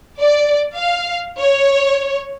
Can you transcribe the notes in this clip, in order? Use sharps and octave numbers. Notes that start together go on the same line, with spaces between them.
D5
F5
C#5